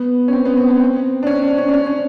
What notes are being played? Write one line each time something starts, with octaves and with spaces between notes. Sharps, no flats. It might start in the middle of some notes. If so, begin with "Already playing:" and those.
Already playing: B3
C#4
C4
B3
C4
C4
C4
D4
C#4
D4
C#4
D4
C#4
C#4